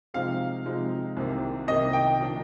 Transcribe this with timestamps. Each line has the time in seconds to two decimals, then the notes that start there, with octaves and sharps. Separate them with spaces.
0.14 C3 F3 G#3 C4 D#4 F5
0.66 C3 F3 G#3 C4 D#4
1.17 C2 C3 D#3 A#3
1.68 C2 C3 D#3 A#3 D#5
1.93 G5
2.19 A#2 F3 A#3 D4